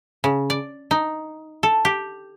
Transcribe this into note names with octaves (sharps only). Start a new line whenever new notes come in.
C#3
D5
D#4
A4
G4